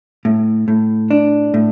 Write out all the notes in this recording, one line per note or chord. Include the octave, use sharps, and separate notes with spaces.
A2
A2
D4
A2